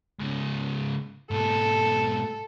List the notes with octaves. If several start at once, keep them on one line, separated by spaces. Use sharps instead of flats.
G#2 C#3
G#2 B2 A4